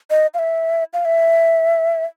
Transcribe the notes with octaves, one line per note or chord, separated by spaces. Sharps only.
D#5
F5
E5
F5
E5